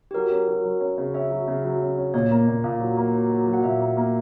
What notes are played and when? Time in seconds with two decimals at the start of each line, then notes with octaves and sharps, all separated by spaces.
0.11 G4
0.14 F#3 A#4
0.31 C#4
0.47 F#3
0.64 F#3
0.80 C#4
0.98 C#3
1.14 C#4 E5
1.30 F#3
1.48 C#3
1.64 F#3
1.81 C#4
1.97 C#4
2.14 A#2 C#5
2.31 A#3
2.47 A#2
2.64 A#2
2.80 F#3
2.97 A#3
3.14 F#3
3.30 F#3
3.47 F#3
3.53 F#5
3.63 A#2 E5
3.80 A#3
3.97 A#3